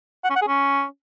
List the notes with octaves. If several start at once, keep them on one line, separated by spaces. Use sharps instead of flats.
F#5
C#4
F#5
G#4
C#4